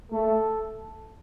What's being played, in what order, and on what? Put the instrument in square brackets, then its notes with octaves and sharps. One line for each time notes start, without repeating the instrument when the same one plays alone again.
[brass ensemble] A3 [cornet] A4